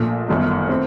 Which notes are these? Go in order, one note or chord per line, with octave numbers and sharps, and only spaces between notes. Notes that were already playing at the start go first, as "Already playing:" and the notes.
Already playing: A#1 A#2 A3
G1 F#2 D#3 A3 D#4
A3 C4